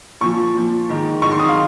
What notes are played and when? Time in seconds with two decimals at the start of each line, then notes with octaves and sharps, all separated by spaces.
0.21 A#2 F3 C#6
0.54 A#2 F3
0.89 G#2 D#3
1.22 G#2 D#3 C#6
1.31 C6
1.39 D#6
1.49 F5